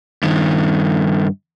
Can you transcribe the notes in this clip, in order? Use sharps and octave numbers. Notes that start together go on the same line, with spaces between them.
G2 D#3